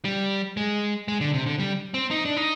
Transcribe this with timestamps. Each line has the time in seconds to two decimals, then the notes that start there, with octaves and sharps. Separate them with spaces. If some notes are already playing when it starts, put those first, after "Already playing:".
0.05 G3
0.57 G#3
1.08 G#3
1.21 D3
1.34 C3
1.46 D3
1.60 G3
1.94 C4
2.11 D#4
2.25 D4
2.37 D#4